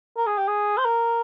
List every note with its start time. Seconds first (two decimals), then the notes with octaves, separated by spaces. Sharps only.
0.17 A#4
0.26 G#4
0.37 G4
0.48 G#4
0.77 C5
0.85 A#4